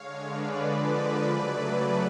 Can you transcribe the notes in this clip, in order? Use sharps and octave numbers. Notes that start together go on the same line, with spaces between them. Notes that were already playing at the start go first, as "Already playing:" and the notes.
Already playing: D3 G#3 C#5 F5
B4 D5
D3 F3 G#3
B4 D5
C#3 F#3 A3